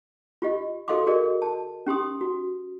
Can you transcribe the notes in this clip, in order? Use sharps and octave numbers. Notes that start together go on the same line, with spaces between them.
F4 G4 D#5
F#4 A4 D#5 F5 C6 D6
F#4 G#4 A#4 D5 D#5
A5
C#4 G4 C6 D#6
F#4